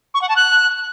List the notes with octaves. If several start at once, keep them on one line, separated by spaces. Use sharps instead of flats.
C#6
F#5
A5
F#6